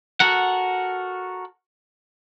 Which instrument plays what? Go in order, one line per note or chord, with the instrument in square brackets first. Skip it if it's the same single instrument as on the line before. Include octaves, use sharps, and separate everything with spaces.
[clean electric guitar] F#4 A4 A#4 F#5